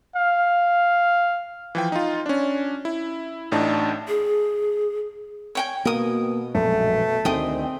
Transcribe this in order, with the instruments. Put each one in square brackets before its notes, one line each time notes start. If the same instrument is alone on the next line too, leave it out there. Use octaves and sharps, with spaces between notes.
[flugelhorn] F5
[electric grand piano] E3 F3 G5
D#4 F4
C#4 D4
E4
A1 A2 D4 D#4 A5
[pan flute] G#4
[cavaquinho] C#5 G5 G#5
[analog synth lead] B2 [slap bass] A#3 [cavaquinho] A#4 D#6
[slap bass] A#1 F#2 G#3 [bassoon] A3
[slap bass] D2 D#3 [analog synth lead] C4 [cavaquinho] G#4 G5 D#6